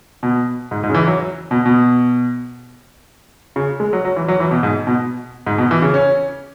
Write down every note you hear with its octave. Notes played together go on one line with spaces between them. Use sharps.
B2
G#2
G#2
C#3
E3
F#3
B2
B2
C#3
G#3
F#3
F#3
E3
F#3
E3
B2
G#2
B2
G#2
B2
E3
C#3
C#4